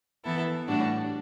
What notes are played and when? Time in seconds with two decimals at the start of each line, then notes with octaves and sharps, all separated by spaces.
0.25 E3 B3 E4 A4
0.67 A2 G3 D4 F#4